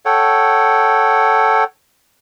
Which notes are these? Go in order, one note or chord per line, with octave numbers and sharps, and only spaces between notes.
A4 C#5 F#5 G5